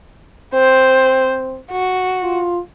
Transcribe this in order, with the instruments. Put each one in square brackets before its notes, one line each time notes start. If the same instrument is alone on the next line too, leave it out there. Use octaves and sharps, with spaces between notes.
[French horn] C4 [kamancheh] C5
[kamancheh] F#4
[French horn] F4